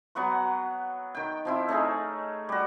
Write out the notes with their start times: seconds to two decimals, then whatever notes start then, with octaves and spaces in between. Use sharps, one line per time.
0.15 F#3 B3 F#5 C#6
1.15 D#3 G5
1.45 F3 C4 E4
1.69 A3 C#4 D#4 G#4
2.49 G3 F#4